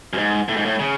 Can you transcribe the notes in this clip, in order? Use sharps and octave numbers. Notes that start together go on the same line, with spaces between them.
F#2
G#2
A2
G#2
A2
C#3